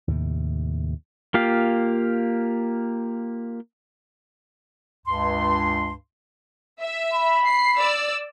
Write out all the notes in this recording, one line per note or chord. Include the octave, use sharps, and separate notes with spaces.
D#2 A2 C3
A#3 F4 G4 F5
C#2 G2 C6
E5
B5
C7
D5 E6